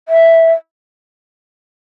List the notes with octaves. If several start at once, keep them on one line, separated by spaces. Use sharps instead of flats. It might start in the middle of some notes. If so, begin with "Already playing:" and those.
E5